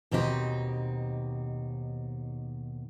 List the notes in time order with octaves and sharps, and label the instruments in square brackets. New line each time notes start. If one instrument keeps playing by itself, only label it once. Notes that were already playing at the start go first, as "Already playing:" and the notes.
[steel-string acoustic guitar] D#2 B2 C4 D#4 F4 G4